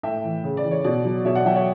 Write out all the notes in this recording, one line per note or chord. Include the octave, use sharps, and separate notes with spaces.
A2 E5 G5
E3
C#3
D5
E3
C#5
B2 D5
F#3
B2 C#5 E5
D5 F#5
F#3 E5 G5
C#5 E5